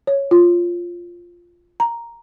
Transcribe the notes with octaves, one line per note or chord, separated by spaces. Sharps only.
C#5
F4
A#5